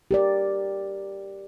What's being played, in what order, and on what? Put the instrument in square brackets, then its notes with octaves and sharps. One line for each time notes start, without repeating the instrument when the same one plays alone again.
[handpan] G4 A#4 D5